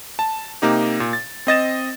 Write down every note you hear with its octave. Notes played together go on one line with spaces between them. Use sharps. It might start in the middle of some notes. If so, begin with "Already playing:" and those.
A5
C3 A#3 D#4 G4
A#2
A6
C4 D#5 A6 E7